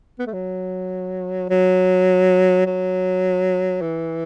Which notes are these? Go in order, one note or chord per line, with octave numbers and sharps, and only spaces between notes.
B3
A3
F#3
F#3
F#3
E3